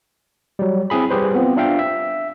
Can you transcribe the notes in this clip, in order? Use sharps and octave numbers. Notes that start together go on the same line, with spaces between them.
F#3 G3
C4 E4 G#4 B5
G3 G4 G#4 B4 C5
B3 C4 F4
D4 F4 E5 F5 G5
E5